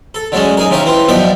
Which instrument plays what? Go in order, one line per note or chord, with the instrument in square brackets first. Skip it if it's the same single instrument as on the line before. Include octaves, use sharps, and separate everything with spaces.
[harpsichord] A4
D3 F#3 G#3 C#4
D#4 G#4 A#4
C3 D#3 C#4 F4 A#4
E3 C4 F4
B1 B2 F3 D5 E5 G5